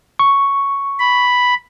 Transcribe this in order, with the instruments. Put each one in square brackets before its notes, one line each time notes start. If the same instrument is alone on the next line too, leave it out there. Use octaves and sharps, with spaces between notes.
[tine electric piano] C#6
[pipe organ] B5